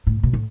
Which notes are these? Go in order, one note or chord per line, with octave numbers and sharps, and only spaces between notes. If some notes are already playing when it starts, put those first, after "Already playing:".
A2
B2
A2